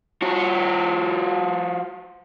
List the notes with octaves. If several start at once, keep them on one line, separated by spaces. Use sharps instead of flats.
F3 F#4